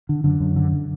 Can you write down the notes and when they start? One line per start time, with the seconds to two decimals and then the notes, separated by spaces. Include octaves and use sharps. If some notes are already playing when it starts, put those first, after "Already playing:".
0.09 D3
0.24 F#2 D3
0.40 F#2
0.56 D3
0.72 D3